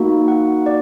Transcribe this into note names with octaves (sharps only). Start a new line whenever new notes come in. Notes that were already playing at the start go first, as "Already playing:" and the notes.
Already playing: A#3 D#4 F#4
F#5
D5